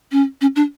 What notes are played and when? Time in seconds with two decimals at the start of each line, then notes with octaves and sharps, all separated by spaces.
0.12 C#4
0.41 C#4
0.56 D4